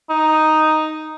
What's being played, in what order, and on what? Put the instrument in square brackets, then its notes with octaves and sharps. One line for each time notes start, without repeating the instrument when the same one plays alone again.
[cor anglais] D#4